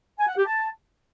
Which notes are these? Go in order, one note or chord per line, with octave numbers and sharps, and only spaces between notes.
G#5
F#5
G4
A5